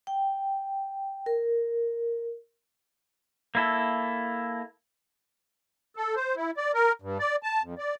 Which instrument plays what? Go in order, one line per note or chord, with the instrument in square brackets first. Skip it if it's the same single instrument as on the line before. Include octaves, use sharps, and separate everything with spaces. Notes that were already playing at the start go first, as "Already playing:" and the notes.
[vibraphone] G5
A#4
[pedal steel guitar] A#3 E4 A4
[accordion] A4
C5
E4
D5
A#4
G2
D5
A5
F2
D5